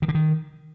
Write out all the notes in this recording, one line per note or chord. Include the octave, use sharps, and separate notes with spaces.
D#3
D3
D#3